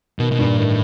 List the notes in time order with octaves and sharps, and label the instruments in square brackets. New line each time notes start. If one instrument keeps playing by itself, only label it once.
[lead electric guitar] B2 [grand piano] D#3
[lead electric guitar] B2
[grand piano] G2
[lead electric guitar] A#2
[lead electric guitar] A2 [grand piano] D#3